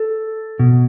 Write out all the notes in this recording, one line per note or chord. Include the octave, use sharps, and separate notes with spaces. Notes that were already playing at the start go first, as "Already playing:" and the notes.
Already playing: A4
B2